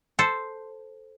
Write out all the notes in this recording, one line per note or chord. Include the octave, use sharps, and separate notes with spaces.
A4 C5